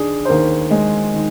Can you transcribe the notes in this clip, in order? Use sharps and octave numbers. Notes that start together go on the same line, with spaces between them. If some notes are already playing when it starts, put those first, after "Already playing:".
Already playing: D#3 D4 G#4
C5
D#2 A#4
G#3
D#3